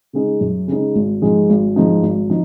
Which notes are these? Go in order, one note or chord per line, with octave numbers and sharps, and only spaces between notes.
C#3 G#3 D#4
F#2
C#3 G#3 D#4
G#1
G#2 F3 G#3 D#4
G#1
G#2 F3 G#3 D#4
G#1
F3 D#4